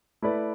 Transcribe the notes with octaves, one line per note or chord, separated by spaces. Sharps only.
A3 E4 B4 D5